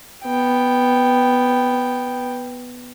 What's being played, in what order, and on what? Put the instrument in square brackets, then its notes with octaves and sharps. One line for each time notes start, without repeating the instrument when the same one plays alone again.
[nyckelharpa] B3 G5